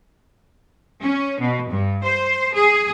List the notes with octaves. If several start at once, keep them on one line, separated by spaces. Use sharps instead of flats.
C#4
B2
G2
C5
G#4